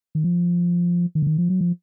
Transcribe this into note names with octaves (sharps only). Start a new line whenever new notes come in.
D#3
F3
D#3
D3
D#3
F3
F#3
F3